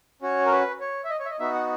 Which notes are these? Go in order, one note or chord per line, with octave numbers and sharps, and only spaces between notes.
C#4 F#4 C#5
A#4
B4
C#5
E5
D#5
C#5
E5
D#5
B3 D#4 F#4 E5
F#5